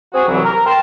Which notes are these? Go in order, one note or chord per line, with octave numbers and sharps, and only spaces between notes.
C4 F#4 G#4
C2 E3 F#3
A#4
G5 A5 C6